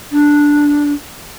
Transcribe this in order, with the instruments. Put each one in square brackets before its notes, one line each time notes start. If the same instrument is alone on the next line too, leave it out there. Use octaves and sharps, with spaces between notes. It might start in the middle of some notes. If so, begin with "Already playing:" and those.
[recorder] D4